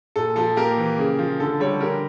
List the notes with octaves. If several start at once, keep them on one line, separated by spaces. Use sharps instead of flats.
A#2 A4
F3 A4
A#3 G4 A#4
E3
C#3
F3
D3 A4
G3 A4 C#5
D3 G4 A#4